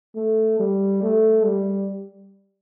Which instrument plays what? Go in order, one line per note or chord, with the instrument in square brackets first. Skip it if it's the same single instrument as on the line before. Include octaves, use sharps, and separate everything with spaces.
[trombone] A3
G3
A3
G3